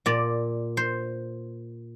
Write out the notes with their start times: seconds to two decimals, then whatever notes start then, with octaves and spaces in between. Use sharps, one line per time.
0.06 A#2 D5
0.77 C5